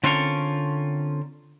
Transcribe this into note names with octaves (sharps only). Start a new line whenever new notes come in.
D3 C4 C#4 F4 A4 A#4